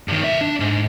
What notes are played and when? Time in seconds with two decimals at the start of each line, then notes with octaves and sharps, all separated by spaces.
0.08 G2 D#3
0.24 B1 E5
0.41 D4
0.60 G#2